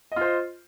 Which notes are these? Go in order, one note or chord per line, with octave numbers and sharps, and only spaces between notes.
F4 C5 D#5